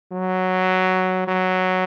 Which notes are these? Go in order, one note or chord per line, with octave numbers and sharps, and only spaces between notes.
F#3
F#3